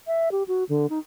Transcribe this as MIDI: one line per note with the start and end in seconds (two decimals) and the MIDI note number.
0.07 0.29 76
0.32 0.43 67
0.48 0.64 66
0.69 0.86 50
0.90 0.99 63